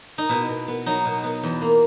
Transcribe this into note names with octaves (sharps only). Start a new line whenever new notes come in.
D#4
B2 E4
B2
B3
F#3 D#4
B2
B3
E2
A#3